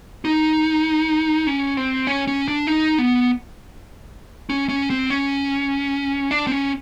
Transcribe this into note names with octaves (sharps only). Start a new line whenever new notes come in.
D#4
C#4
C4
C#4
C#4
D4
D#4
B3
C#4
C#4
C4
C#4
D4
C4
C#4